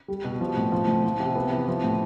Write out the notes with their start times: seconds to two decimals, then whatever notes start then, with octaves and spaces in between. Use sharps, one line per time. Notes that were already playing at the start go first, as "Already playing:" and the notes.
0.08 G3
0.24 B2
0.40 F3
0.56 A2
0.72 F3
0.88 A2
1.04 F3
1.20 C3
1.36 B3
1.52 E3
1.68 F3
1.84 A2